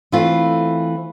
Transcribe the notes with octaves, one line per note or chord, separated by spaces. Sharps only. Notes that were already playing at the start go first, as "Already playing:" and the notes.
E3 A3 C4 F4